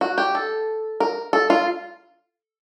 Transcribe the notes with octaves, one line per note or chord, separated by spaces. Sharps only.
F#4
G4
A4
A#4
A4
F4